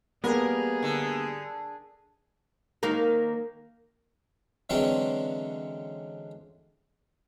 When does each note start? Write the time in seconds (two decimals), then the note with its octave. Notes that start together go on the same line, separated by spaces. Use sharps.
0.24 G3 A#3 B3 G#4 A#4
0.83 D3
2.83 D#3 A#3 A#4
4.70 D3 E3 F#3 G#3 C4 C#4